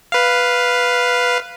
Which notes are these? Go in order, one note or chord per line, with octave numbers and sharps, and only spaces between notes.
B4 F5